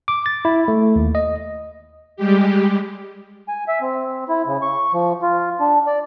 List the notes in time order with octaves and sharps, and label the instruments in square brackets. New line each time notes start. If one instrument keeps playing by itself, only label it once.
[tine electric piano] D6
A6
E4
A3
D#2
D#5
[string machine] G3 G#3 G4
[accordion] G#5
E5
C4
E4
C#3
C#6
F3
F4
D4
D5